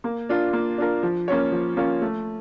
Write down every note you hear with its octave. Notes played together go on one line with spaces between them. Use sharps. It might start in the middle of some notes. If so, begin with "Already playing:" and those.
A#3
D4 F4 A#4
A#3
D4 F4 A#4
F3
A#3 C#4 F4 C#5
F3
A#3 C#4 F4 C#5
A3